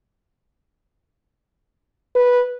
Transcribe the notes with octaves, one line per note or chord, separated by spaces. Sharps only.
B4